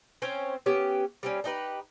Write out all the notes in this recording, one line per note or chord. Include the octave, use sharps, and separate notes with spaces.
C4 C#4 C5 C#5
B3 C#4 G4
G3 C4 C#4
D4 D#4 G4 B4